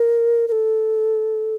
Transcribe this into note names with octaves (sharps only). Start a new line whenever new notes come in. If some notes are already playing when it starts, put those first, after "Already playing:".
Already playing: A#4
A#4
A4